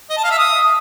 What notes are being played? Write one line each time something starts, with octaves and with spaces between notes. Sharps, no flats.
D#5
A5
F5
E5
D#6